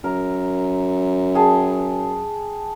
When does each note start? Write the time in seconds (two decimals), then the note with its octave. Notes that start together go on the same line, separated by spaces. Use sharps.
0.04 F#2 A#4
1.35 G#4 G5 A5